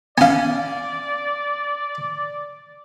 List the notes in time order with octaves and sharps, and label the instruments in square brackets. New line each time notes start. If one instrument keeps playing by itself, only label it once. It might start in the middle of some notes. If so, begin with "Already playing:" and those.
[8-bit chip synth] B3 C#4 [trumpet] D5 [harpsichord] F5 G#5